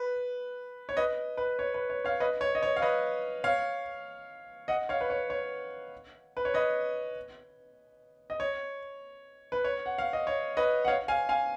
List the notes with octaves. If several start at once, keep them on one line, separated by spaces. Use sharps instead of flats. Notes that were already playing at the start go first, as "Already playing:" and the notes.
Already playing: B4
C#5
B4 D#5
B4
C#5
B4
C#5
C#5 F5
B4 D#5
C#5
D#5
C#5
F5
B4 D#5
C#5 F5
D#5 F#5
C#5 F5
B4
C#5
C#5
B4
C#5
B4 D#5
D#5
C#5
B4
C#5
F#5
F5
D#5
C#5
B4 D#5
F#5
C#5 F5
F5 G#5
F5 G#5